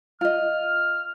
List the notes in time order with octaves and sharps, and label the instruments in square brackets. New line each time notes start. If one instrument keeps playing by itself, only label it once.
[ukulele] F4 D#5 [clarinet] F6